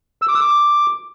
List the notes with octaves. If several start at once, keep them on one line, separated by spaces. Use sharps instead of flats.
E6
D6
E6
D6